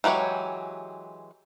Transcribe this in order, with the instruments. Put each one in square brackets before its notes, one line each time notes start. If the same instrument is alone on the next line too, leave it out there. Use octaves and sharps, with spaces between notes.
[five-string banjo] E3 F#3 G#3 G4 C#5